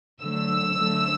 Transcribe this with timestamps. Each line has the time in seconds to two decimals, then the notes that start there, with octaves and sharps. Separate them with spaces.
0.22 D3 F#3 A3 E6
0.76 D3 F#3 A3